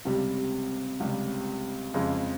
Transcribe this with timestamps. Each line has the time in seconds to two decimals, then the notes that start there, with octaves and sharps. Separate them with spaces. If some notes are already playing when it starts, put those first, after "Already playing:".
0.05 C#2 C3 G3
1.00 C#2 C3 G3
1.94 F2 C#3 G#3